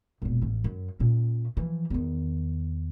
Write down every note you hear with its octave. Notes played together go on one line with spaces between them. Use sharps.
E1 A#2
A1
F#2
A#2 C#4
E3 F3
E2 D#3